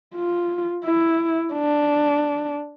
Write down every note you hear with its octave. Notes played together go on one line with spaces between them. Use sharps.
F4
E4
D4